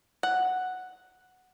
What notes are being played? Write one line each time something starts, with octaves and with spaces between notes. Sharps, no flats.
F#5